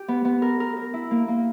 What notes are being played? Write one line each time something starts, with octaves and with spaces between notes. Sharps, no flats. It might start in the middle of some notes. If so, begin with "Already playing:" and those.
Already playing: G4
B3
B3
A#4
A#4
A#4
E4
A#3
A#3